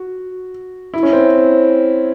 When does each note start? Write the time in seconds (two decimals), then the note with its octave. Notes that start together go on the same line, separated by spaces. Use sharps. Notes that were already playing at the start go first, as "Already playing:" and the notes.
Already playing: F#4
0.94 E4
1.03 C#4
1.13 C4